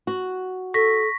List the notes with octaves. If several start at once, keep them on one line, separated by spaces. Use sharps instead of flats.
F#4
A4 C#6 A#6 B6